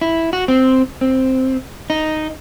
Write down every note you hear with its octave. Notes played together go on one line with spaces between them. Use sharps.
E4
F#4
C4
C4
D#4